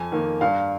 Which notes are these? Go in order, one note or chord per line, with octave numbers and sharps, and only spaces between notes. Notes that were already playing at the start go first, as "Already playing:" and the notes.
Already playing: F2 G#5
D#3 A#3
G2 F5